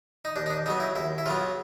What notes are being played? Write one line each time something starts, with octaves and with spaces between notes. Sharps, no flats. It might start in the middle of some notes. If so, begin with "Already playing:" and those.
D#4
D#2 D4
D#4
D4
C#3 F#3 B3 D#4
E4
D#2 E4
E4
C#3 F#3 B3 F4